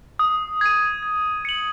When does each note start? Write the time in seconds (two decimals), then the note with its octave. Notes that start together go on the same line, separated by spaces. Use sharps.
0.19 D#6
0.61 G#6 D#7
1.03 G#6
1.45 C#7 F#7